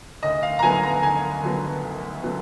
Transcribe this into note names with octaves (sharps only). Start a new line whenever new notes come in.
D2 D#5
F5
A#5
D3 F#3 B3 G#5
A#5
D2 G#5
D3 F#3 B3
D2
D3 F#3 B3